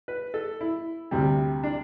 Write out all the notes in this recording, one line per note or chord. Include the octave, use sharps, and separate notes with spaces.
B4
A4
E4
D2 C3 G3
D4